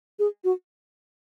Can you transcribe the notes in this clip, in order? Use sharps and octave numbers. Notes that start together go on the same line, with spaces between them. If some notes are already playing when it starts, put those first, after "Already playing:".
G#4
F#4